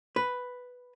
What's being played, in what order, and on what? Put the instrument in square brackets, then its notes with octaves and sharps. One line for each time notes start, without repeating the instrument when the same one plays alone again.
[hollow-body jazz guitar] B4